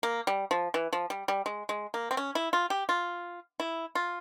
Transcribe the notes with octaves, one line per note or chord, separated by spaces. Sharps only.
A#3
G3
F3
E3
F3
G3
G3
G#3
G#3
A#3
C4
C#4
E4
F4
G4
F4
E4
F4